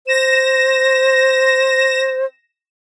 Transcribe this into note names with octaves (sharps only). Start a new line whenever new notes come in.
C5 A#6 E7